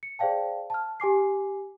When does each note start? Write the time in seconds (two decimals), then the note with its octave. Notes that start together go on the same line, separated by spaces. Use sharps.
0.03 C#7
0.19 G#4 C5 D5 F5 G5 A5
0.70 A5 F6
1.00 G4 G#5 D6 C7